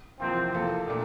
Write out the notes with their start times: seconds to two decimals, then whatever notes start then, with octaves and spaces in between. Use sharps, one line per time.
0.19 E2 C3 F3 A#3 C4 F4
0.54 E2 E3 A#3 F4 A4
0.88 A#2 A3 D4